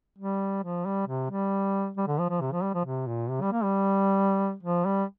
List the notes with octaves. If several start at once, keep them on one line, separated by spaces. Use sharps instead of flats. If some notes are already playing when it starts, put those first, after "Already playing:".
G3
F3
G3
C3
G3
G3
D3
F3
F3
C3
F3
G3
F3
C3
A#2
C3
G3
A#3
G3
F3
G3